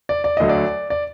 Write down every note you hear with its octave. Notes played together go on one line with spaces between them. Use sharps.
D5
D5
D2 D3 F#3 D#5
D5
D5